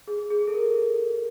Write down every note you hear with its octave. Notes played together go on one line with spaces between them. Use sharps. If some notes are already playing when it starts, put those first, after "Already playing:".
G#4
G#4
A4
A#4